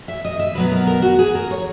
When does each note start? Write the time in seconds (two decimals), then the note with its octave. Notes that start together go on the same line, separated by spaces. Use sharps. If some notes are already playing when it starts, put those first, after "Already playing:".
0.08 E5
0.25 D#5
0.39 E5
0.55 B2 F#3 B3 B4
0.71 A#4
0.87 A#4
1.02 F#4
1.19 G#4
1.35 A#4
1.51 C#5